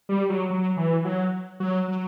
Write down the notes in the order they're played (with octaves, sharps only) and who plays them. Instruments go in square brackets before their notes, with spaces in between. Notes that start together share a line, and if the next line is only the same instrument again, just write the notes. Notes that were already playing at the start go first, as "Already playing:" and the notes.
[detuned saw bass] G3
F#3
F#3
E3
F#3
F#3
F#3